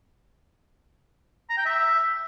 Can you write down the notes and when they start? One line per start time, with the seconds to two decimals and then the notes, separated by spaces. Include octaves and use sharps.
1.50 A#5
1.58 G5
1.65 E5